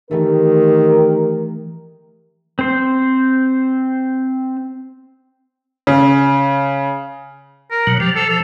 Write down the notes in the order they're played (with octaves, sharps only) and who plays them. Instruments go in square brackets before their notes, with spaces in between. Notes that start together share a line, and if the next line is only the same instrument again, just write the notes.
[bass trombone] D#3 [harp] E3 A3 [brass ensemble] G4 [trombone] A#4
[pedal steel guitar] C4 C5
[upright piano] C#3
[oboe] A#4
[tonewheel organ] B2 F#3
[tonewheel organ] F3 [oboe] G4
[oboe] A4
A4